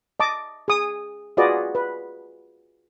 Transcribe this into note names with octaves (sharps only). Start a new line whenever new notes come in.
D#5 A5 D6
G#4 D#6
F4 F#4 G#4 B4 D5 D#5
B4